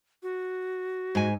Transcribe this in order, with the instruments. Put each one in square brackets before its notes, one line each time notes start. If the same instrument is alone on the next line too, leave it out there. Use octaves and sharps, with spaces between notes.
[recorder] F#4
[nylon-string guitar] G#2 G#5